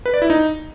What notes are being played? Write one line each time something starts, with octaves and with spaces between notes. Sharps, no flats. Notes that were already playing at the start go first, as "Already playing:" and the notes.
B4
D5
E4
D#4